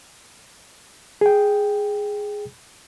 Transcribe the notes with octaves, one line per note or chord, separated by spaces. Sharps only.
G#4 G5